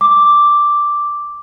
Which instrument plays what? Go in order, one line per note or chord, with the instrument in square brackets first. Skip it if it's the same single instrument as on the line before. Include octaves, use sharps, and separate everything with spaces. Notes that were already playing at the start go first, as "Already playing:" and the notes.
[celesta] D6